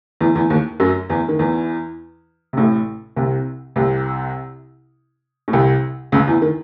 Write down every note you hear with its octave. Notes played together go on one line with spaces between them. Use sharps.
E2 E3
E2 E3
D#2 D#3
F#2 F#3
E2 E3
D#3
E2 E3
C3
A1 A2
C2 C3
C2 C3
A2
C2 C3
C#2 C#3
E2 E3
D#3